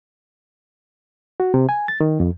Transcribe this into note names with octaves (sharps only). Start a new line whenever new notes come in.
F#4
C3
G#5
A6
D#3
F2